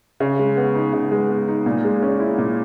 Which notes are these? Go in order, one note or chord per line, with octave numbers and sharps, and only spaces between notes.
C#3
G#3
B3
D#4
C#3
G#3
B3
D#4
A#2
G#3
C#4
E4
A#2